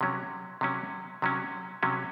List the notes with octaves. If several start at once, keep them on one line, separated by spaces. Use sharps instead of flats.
C3 F#3 C#4
C3 F#3 C#4
C3 F#3 C#4
C3 F#3 C#4